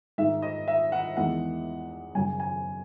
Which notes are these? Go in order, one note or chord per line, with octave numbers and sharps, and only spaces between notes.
G#2 D#3 G#3 E5
D#5
E5
F#5
E2 D#3 G#3 F#5
F#2 C#3 F#3 G#5
G#5